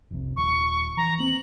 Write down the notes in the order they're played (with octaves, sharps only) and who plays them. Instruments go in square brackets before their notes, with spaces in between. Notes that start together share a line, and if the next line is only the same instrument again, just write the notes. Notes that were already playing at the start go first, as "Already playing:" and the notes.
[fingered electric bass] F1 C2
[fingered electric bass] D#1 [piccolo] C#6
[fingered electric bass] E3 [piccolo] A#5
[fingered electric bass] A#3 C4 [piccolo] F#7